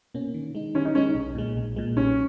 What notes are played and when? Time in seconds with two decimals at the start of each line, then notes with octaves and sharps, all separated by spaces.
0.14 B2 A#3 C#4
0.34 D#3
0.55 G#3 D#4
0.75 D#3 C#4
0.85 D#4
0.95 G#3 C#4 D#4
1.15 B1
1.35 A#2 G#3
1.56 B1
1.76 A#2 G#3
1.96 B1 C#4